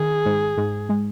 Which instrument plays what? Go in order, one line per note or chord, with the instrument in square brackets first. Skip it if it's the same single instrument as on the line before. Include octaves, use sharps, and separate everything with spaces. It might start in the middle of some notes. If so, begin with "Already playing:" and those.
Already playing: [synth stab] D#3 [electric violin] G#4
[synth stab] G#2
G#2
G#3